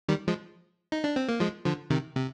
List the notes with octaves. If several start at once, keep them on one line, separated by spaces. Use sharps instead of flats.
D#3 G3
F3 G#3
D#4
D4
C4
A#3
F3 G#3
D3 F3
C3 D#3
C3